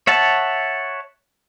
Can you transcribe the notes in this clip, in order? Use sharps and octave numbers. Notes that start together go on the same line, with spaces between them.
C#5 E5 F#5 A5